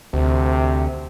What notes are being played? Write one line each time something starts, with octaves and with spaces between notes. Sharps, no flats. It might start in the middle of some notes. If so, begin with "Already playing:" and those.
D2 C3